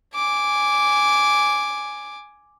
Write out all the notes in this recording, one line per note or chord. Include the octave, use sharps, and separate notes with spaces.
G#5 D6